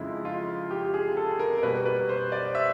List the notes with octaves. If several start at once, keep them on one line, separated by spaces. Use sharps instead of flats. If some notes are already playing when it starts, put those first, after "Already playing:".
Already playing: F2 C#3 F3 G#3 E4
F4
G4
G#4
A4
A#4
A#4
B2 G3 A#3 B4
B4
C5
D5
E5